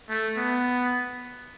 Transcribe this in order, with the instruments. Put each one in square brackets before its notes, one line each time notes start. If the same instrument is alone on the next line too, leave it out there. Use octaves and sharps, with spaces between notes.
[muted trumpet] A3
B3